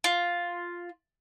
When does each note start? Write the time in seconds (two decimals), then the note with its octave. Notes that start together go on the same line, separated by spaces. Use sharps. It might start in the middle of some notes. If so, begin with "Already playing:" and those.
0.04 F4